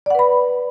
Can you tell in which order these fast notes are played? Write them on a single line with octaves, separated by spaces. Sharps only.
D5 F#5 B4 B5